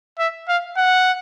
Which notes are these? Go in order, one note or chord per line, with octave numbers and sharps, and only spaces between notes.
E5
F5
F#5